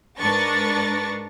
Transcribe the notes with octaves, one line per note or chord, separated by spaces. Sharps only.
G#2 D4 A#4 B4 C#6 A6